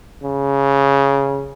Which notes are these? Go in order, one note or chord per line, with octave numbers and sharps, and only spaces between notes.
C#3